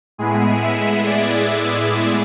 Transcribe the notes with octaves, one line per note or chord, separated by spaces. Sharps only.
A2 G#3 B3 E4 G#4
E5
D5